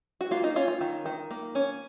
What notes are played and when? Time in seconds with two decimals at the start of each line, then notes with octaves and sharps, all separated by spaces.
0.21 F#4
0.31 A#3 F4
0.44 D#4
0.56 C#4 F4
0.68 F4
0.81 D#3
1.06 D#3
1.31 A#3
1.55 C#4